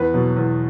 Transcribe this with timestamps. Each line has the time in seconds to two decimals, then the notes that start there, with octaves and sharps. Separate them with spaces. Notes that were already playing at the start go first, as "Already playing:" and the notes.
Already playing: E2 B4
0.14 B2 F#3
0.37 E2